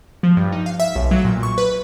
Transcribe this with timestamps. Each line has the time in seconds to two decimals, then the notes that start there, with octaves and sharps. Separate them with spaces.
0.23 F3
0.37 G2
0.52 D#4
0.66 F5
0.80 E5
0.96 B1
1.11 F#3
1.25 A#2
1.43 C#6
1.58 B4